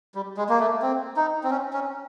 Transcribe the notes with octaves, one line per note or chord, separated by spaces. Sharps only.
G3
G#3
A#3
A3
C4
D#4
C4
C#4
C#4